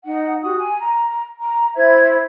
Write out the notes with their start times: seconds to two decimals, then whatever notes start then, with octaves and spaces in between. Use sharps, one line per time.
0.03 D#4 F#5
0.42 F#4 G4 D#6
0.57 G#5
0.80 A#5
1.39 A#5
1.75 E4 C5 E5 G#6